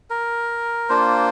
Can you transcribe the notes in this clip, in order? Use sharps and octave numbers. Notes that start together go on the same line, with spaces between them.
A#4
A#3 D4 F4 C5